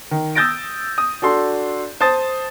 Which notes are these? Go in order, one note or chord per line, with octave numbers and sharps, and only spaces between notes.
D#3
D#6 E6 G6 A6 A#6 D7
D#6
D4 F#4 A4 C6
C5 A5 D#6 A6